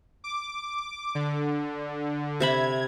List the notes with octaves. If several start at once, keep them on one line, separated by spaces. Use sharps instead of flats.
D6
D3
C3 E5 B5 G#6